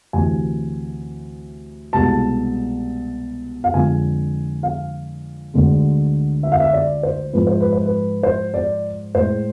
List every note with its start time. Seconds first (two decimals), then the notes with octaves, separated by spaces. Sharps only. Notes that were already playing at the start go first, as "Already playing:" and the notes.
0.13 D2 C3 E3 G#5
1.93 C2 B2 G#3 A5
3.64 F5
3.74 F2 D3 G#3 G#5
4.63 F5
5.54 D2 D3 G#3
6.43 E5
6.52 F5
6.60 E5
6.73 D5
7.03 C5
7.33 G#2 F3 G#3 B4
7.47 C5
7.60 B4
7.73 C5
7.86 B4
8.23 C5
8.54 D5
9.14 A2 G#3 C5